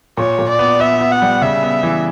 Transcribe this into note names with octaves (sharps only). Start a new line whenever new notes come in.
A#2 C#5
A#2
D5
B3
B3 E5
B3
F#5
G3
C#3 E5
B3
E3